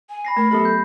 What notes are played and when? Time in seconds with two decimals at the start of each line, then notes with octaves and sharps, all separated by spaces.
0.10 G#5
0.25 B5 A#6 C7
0.37 A3 A#4
0.51 F#3 B3 G4 A4
0.65 G6